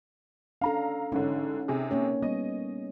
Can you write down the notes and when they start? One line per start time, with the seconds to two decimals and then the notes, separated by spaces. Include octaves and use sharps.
0.61 C#4 D4 A4 F5 A#5
1.12 A1 G#2 D3 C#4 D#4
1.68 C3 G#4
1.91 A#3 C#4 C#5
2.23 G3 B3 D#5